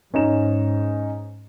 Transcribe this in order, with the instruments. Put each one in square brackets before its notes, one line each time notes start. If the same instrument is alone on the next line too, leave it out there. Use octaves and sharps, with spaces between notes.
[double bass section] G#2 [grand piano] C#4 D#4 E7